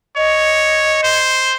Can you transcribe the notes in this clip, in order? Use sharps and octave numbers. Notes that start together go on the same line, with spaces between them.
C#5 D#5
C5